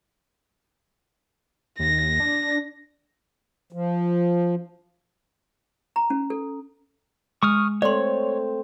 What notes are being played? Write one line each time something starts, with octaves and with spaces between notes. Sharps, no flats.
D#2 A#6
D4
F3
A#5
C#4
A4
G#3 C#6 D#6 F6
A3 C4 C#5 D5 C6